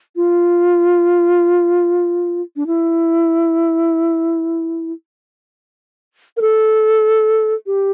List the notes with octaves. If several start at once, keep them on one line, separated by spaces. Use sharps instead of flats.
F4
D4
E4
A#4
A4
G4